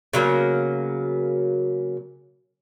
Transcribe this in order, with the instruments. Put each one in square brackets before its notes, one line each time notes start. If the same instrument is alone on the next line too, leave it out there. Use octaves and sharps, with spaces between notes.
[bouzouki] C#3 F#3 A#3 B3